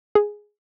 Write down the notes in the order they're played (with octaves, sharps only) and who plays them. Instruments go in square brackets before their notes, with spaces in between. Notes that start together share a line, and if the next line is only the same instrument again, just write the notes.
[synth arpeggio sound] G#4